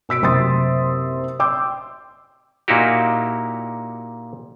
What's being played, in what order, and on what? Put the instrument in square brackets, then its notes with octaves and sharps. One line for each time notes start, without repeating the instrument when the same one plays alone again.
[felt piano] B2 E6 B6 D7
F#1 C3 C6 D#6 A6
G5 C6 D6 E6 G6
[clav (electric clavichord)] A#2 A#3 D#4 E4 F#4 G4